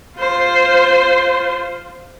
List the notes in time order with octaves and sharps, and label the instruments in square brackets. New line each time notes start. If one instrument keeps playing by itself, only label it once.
[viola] F4 C5